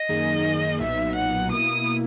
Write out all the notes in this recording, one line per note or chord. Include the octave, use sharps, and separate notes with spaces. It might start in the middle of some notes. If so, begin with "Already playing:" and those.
Already playing: D#5
F#2 D#3 A#3 D#4 G#4
B1 A#2 F#3 B3 D#4 E5
F#5
B2 A#3 E4 D#6